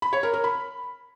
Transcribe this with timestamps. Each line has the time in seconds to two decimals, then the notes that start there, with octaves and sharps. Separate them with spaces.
0.02 B5
0.13 C#5
0.23 A#4
0.33 A#4
0.44 B5